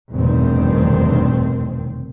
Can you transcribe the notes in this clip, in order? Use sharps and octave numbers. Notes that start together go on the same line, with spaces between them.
F1 E2 G2 B2 D#3 C4